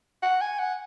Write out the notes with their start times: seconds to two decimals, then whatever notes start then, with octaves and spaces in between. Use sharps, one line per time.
0.23 F#5
0.41 G#5
0.59 F#5